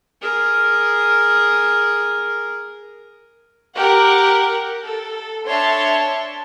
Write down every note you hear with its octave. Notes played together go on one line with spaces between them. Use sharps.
G#4 A#4
G4 A#4 F#5
A4
D4 C#5 E5 A5 C6